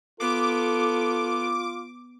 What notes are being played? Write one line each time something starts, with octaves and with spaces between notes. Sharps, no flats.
B3 F4 A4 D6